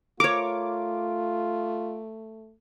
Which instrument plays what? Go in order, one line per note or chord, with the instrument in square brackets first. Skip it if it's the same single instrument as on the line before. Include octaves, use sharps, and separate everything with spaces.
[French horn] A3 [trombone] F4 [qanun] A#4 C#5 [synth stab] D6